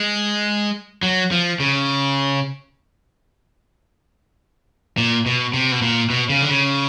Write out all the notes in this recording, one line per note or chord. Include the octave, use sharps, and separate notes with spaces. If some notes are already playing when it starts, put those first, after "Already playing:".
Already playing: G#3
F#3
F3
C#3
A#2
B2
C3
B2
A#2
B2
C#3
D3
C#3